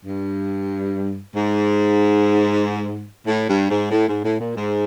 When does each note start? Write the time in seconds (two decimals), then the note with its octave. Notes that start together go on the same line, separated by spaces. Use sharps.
0.05 G2
1.35 G#2
3.27 A2
3.48 G2
3.70 G#2
3.91 A2
4.08 G#2
4.24 A2
4.39 A#2
4.55 G#2